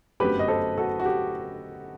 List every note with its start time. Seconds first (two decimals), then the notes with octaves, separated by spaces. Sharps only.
0.20 G1 F#2 F#3 A3 C4 G4 B4
0.39 D#5
0.48 A4 C5
0.78 F#4 A4
1.00 F#4
1.05 G4